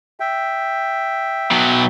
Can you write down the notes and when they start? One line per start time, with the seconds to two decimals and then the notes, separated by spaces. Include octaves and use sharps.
0.20 E5 G5
1.51 B2 F#3